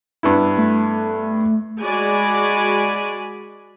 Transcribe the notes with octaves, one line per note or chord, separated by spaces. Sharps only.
G2 B3 E4
A3
G#3 F#4 D5 G#5 B5